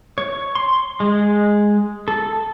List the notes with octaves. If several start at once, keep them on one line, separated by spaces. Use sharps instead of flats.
C#5
C6
G#3
A4